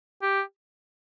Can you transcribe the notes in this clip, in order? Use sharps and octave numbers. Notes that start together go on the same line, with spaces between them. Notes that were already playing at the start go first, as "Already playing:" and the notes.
G4